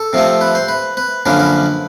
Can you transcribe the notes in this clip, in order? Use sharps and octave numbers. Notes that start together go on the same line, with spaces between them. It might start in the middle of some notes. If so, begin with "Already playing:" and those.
Already playing: A4
C3 F3 A3 C4
B4
C5
B4
B4
F#2 D3 F3 A#3 C#4 B4
B4